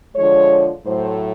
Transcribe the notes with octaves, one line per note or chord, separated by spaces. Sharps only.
D3 F3 G#3 C#5
A2 F#3 A3 C5